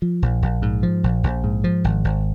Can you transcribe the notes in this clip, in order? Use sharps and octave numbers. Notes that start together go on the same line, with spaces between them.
F3
A#1
A#1
G#2
F3
A#1
A#1
G#2
F3
G#1
G#1